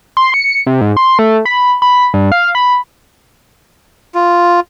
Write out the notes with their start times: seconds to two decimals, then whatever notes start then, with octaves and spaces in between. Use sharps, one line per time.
0.17 C6
0.34 C#7
0.67 C3
0.81 G#2
0.97 C6
1.19 A3
1.45 B5
1.82 B5
2.14 G2
2.32 F5
2.55 B5
4.14 F4